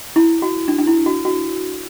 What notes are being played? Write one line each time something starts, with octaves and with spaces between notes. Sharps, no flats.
E4
F#4
D4
D4
E4
F#4
F#4